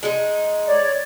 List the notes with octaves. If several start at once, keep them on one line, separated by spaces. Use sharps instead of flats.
G#3 D#4
C#5 D5